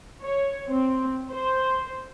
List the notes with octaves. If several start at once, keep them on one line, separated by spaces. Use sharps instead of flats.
C#5
C4
C5